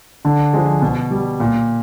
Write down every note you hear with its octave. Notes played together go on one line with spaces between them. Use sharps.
D3
F3 G#3
B2
G3
A#2